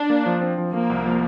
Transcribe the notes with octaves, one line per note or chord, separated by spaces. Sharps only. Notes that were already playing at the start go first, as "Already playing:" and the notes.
Already playing: D4
A#3
F3
C4
F3
F3 A#3
C2
F3